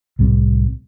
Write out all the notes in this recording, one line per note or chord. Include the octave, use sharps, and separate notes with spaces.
C2 A2 G3 C4